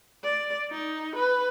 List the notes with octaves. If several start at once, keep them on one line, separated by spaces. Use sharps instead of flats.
D5
D#4
B4